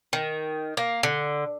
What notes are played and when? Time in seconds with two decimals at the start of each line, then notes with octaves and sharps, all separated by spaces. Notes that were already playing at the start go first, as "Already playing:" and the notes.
0.13 D#3
0.77 A#3
1.03 D3